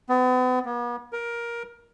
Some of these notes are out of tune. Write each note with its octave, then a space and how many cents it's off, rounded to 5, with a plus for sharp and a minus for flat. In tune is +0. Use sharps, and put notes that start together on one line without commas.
B3 +40
B3 -45
A#4 +15